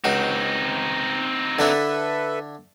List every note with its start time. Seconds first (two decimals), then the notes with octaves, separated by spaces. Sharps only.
0.04 C#2 C4 D#4 F#4
1.59 D3 D4 E4 A4 B4 E5